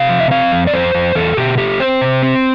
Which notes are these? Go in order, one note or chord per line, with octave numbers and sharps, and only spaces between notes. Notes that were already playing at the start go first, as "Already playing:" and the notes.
Already playing: C3 F5
F3
E5
C4 F5
F2
D5
F2 C5
F2
E2 A4
B2 G4
A3 G4
C4 C5
C3
C4